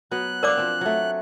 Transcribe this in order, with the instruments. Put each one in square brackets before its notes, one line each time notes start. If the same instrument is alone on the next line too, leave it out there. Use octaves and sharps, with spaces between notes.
[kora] F#3 B3 [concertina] F#6
[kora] D4 F5 [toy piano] A#4 D5 D6
[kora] F3 C4
F#3 A3